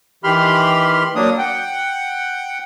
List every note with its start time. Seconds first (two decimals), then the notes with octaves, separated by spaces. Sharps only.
0.24 D#3 E3 G4 B5 C6 F6
1.16 F#3 A#3 D4 D#6
1.38 F#5 G5